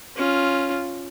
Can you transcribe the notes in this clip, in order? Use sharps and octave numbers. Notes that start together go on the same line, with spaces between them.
C#4 F4